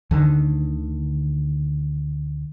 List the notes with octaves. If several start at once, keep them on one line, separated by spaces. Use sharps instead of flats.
D2 D3 D#3